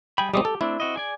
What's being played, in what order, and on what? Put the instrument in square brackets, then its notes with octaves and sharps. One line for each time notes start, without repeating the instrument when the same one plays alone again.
[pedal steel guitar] G3 G#4 B5 [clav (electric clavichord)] G5
[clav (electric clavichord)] G3 G#3 C4 [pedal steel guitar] D#4 D6 D#6
[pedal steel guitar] G4 [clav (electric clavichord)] A4
[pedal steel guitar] A3 C4 D4 [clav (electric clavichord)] E4
[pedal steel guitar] C4 F#4 D#5
G#4 D5 G#5